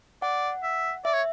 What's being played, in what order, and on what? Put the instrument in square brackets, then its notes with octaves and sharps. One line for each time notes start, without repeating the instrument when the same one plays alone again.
[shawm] D5 [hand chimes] F#5
[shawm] E5
[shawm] D5 [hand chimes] E5
[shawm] C#5